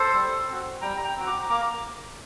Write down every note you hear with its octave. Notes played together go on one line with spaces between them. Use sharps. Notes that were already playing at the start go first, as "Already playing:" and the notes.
Already playing: A4 C5
G3
C4 F#4
G3 G5 A#5
G5 A#5
C4 F#4
A#5 D6
A#3 A#5 D6